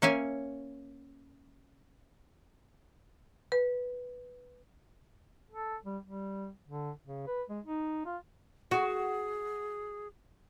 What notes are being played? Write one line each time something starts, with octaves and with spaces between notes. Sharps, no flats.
A#3 C#4 E5 G#5
B4
A4
G3
G3
D3
C#3
B4
G#3
D#4
F4
F#4 G#4